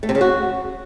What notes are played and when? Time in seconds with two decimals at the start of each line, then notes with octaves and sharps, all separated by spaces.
0.03 A3
0.09 C3
0.15 C#3
0.21 F#4